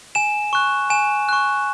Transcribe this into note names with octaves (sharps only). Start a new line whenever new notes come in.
G#5 E7
C#6 F#6
G#5 E7
C#6 F#6